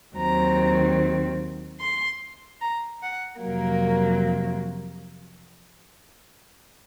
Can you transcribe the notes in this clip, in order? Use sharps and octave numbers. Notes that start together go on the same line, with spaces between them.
D#2 D#3 F#3 C4 A#5
C6
A#5
F#5
F2 C3 F#3 A#3 A#4